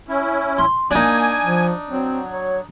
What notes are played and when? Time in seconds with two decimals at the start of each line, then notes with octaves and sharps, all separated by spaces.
0.08 C#4 E4
0.58 C6
0.91 A#3 D4 D#4 G#5
1.45 F3
1.90 F#3 C4
2.31 C#5